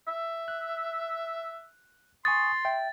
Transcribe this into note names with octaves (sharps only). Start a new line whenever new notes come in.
E5
F#6
G#5 C6 C#6 D#6 A6
E5 G5